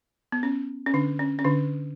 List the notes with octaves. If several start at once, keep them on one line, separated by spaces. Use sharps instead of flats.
B3
C#4
C#4
D3 D4
C#4
C#4
D3 D4